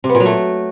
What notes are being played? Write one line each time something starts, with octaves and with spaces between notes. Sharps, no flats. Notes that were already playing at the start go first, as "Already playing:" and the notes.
C3
B3
A#2
F#3
A3